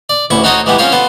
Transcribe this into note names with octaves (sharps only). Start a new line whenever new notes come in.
D5
A1 D2 E4 C#6
D#4 F#4 A4 C5 C#5 D#5
E3 G#3 B3 G4
C4 C#4 F4 C5 C#5
B3 A4 C5